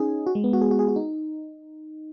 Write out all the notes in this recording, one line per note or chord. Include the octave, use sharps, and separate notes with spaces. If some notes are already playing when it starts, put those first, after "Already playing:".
Already playing: C#4 D#4 G#4
F#4
G#3
B3
F#4
G#4
F#4
G#4
F#4
D#4